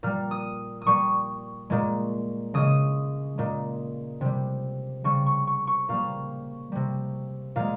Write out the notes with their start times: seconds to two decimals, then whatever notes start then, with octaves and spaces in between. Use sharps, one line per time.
0.03 A#2 G3 F6
0.31 D#6
0.82 D#6
0.87 A#2 G3 C#6
1.70 A#2 G#3
2.54 C#3 G#3 D#6
3.38 A#2 G#3
4.21 C3 G3
5.04 C#3 G3 C#6
5.26 C#6
5.47 C#6
5.67 C#6
5.89 A#2 G3 F5
6.72 C3 G3
7.56 A#2 G#3 F5